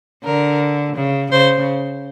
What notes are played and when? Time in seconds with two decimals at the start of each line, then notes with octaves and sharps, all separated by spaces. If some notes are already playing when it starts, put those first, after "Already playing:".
0.24 D3 A#4
0.96 C#3
1.32 C#3 C5